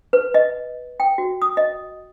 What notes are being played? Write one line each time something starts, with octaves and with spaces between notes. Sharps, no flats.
B4
D#5
G5
F#4
D#6
D#5